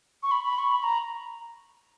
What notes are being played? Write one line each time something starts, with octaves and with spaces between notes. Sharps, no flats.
C#6
B5
B5
C#6
B5
A#5